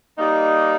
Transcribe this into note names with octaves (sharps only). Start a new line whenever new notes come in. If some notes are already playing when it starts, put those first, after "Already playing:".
G3 A#3 D#4